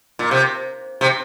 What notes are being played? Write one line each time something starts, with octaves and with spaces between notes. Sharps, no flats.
A#2
C3
C3